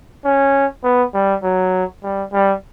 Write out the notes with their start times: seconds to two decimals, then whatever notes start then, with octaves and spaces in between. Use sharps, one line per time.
0.25 C#4
0.84 B3
1.14 G3
1.43 F#3
2.03 G3
2.33 G3